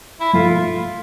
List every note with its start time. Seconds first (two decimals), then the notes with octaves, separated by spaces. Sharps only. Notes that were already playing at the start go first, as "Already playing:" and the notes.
0.20 E4
0.33 F3 A3 F4